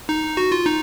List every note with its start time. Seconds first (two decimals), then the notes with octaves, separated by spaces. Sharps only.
0.09 D#4
0.37 F#4
0.52 F4
0.66 D#4